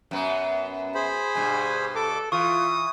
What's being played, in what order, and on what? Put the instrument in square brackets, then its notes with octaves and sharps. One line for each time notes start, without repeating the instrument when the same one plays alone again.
[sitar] F#2 B3
[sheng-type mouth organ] G#4 C5 B5
[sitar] G2 B2 [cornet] G#5
[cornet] A4 [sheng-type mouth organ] D6
[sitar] E3 [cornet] F4 [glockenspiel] C#6 [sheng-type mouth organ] D#6